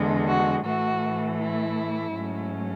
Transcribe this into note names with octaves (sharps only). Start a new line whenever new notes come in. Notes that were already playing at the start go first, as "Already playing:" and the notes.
Already playing: E2 D3 G#3
F#4
A2 E3 A3 F#4
E4
G#2 F#3 A3 C#4